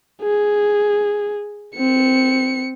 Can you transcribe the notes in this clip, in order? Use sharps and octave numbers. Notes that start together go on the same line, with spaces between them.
G#4
C4 C#7